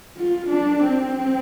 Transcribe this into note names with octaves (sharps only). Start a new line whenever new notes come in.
F4
D4
C4